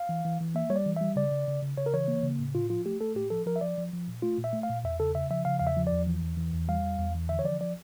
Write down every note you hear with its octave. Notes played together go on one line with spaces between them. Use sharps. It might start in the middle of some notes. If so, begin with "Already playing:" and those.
Already playing: F5
E3
E3
E3
A#3 E5
G3 C#5
D5
E3
G3 E5
C#3 D5
C#3
C#3
C#3
C#3 C#5
A#4
E3 C#5
A#3
C#3
A2
A2 F4
F3 F4
A3 G4
A3 A4
A2 G4
F3 A4
F3 A#4
E5
F3 D5
F3
F3
A#2
A3 F4
A#2
E5
A3
F5
A#2
E2 E5
C#3 A4
C#3 E5
F3 E5
C#3 F5
E2 F5
E5
F3
D5
E2
E3
E2
E3
E2
G3 F5
E2
E2
E3
D3 E5
C#5
F3 D5
F3 D5